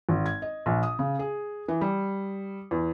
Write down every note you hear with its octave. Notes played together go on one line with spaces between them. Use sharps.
G#1
G#6
D#5
A#1
D#6
C#3
G#4
E3
G3
E2